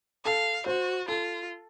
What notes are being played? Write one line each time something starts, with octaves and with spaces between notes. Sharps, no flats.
A4 F5
F#4 C5
F4 A4